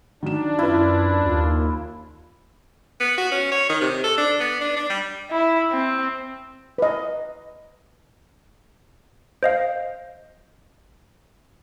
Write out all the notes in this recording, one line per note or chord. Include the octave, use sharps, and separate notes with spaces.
D#3 F#3 D4 E7
F#2 C#4 E4 F4 B4
D#2 F4
B3
F#4
C#4
C#5
D#3
C3
A4
D4
B3
D4
D4
G3
E4
C4
B4 D#5
C5 D#5 F5